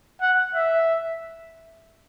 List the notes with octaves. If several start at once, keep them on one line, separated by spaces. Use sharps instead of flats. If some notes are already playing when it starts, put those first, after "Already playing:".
F#5
E5